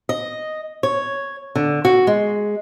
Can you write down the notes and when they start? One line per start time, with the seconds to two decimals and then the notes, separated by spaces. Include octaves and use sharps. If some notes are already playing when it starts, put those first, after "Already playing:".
0.09 D#5
0.83 C#5
1.55 D3
1.85 F#4
2.07 G#3